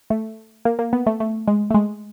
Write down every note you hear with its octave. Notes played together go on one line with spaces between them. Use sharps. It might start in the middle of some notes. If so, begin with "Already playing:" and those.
A3
A#3
A#3
B3
A3
A3
G#3
A3
G#3